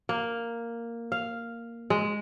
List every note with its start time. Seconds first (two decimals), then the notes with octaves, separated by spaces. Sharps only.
0.09 A#3
1.12 F5
1.90 G#3